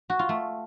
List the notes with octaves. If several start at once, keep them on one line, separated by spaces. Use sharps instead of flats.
F#4
F4
A3